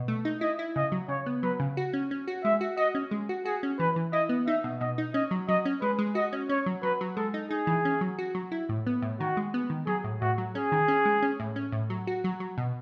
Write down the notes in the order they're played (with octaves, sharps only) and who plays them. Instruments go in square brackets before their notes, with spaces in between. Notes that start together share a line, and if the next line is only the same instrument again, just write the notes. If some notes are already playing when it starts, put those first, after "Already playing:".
Already playing: [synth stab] B2
A3
D#4
[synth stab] E4 [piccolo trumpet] D#5
[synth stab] E4
[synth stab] C#3 [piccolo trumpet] D#5
[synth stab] F#3
[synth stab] C#3 [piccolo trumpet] C#5
[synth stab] B3
[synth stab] F#3 [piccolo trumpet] B4
[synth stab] C#3
F#4
C#4
C#4
F#4
[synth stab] G#3 [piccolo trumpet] E5
[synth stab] F#4
[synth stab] F#4 [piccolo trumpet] D#5
[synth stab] C#4
G#3
F#4
[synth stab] F#4 [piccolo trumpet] G#4
[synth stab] C#4
[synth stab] E3 [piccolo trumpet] B4
[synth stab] E3
[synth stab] E4 [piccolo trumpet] D#5
[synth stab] B3
[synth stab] D#4 [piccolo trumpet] E5
[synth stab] B2
[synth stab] B2 [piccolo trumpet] D#5
[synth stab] D#4
[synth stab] C#4 [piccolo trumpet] D#5
[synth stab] F#3
[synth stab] F#3 [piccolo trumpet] D#5
[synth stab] C#4
[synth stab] G#3 [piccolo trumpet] B4
[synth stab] G#3
[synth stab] F#4 [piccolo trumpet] D#5
[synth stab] C#4
[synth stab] C#4 [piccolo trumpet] C#5
[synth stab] F#3
[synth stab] F#3 [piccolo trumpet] B4
[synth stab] F#3
[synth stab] G#3 [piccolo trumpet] A4
[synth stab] D#4
[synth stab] D#4 [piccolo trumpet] G#4
[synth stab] E3
C#4
F#3
F#4
F#3
E4
A2
B3
A2
[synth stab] D#3 [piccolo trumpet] F#4
[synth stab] G#3
B3
D#3
[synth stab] F#3 [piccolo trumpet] G#4
[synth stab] A2
[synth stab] A2 [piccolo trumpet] F#4
[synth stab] F#3
[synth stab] C#4 [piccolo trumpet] G#4
[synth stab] D#3
C#4
G#3
C#4
A2
C#4
A2
F#3
F#4
F#3
F#3
B2